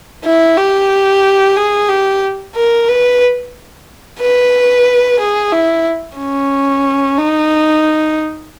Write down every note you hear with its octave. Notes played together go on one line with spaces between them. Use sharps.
E4
G4
G#4
G4
A#4
B4
B4
G#4
E4
C#4
D#4